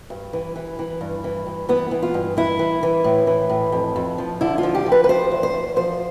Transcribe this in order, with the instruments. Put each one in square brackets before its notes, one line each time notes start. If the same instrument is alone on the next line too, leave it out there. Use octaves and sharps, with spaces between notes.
[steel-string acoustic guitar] G2
E3
E3
E3
G2
E3
G2
E3 B3
E3
F4
G2
E3 E4
E3
E3
A2
E3
A2
F2
F2
F3
D3 E4
F4
F3
G4
F3
B4
B4
F3 C5
E2
C5
E2
F3 C5